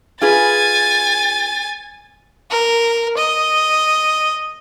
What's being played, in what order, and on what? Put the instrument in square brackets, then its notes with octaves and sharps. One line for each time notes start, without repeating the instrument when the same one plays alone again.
[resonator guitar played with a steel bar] F4 G#4 B4 [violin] G#5 A6
[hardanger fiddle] A#4
D#5